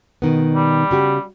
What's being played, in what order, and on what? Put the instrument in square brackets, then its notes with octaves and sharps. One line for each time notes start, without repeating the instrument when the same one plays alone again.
[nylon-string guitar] B2 D#3 B3
[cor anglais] G3
[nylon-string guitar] C#3 F#4 G4